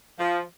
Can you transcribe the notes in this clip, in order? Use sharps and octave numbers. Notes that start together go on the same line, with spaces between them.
F3